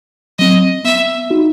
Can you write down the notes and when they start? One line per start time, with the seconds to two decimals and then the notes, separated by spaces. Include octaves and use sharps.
0.39 F#3 C4 D#5
0.84 B3 E5
1.30 D#4 F#4